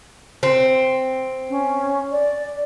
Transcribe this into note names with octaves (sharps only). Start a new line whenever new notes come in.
C4
C#4
D5